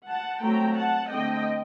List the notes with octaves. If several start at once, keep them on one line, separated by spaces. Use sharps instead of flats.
F#5 A5
F#3 A3 C4 G5 A#5
F#5 A5
D3 A3 C4 D#5 G5